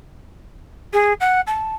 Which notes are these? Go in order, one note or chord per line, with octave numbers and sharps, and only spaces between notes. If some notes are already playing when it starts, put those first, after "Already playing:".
G#4
F#5
A5